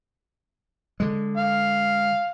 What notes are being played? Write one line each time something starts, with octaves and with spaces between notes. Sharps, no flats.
D3 G#3
F5